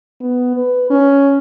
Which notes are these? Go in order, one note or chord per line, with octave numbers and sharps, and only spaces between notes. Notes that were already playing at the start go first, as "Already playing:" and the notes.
B3
B4
C#4